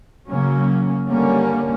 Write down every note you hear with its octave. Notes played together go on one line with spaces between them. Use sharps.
C#3 F#3 A#3 C#4
D3 G3 A#3 C#4